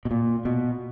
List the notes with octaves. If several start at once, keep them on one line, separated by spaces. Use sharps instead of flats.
B2
A#2
B2